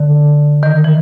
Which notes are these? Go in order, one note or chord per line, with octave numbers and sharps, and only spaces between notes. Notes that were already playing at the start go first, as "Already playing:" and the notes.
Already playing: D3
D#3
E3